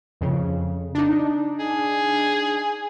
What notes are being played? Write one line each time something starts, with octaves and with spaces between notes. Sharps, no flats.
F2 C#3
D4 D#4
G#4